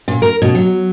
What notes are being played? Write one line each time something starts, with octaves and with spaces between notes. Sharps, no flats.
A#2
A#4
B2
F#3